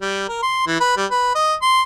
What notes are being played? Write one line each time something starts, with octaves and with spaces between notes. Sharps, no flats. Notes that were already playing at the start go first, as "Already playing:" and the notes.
G3
A#4
C6
E3
B4
G3
B4
D#5
C6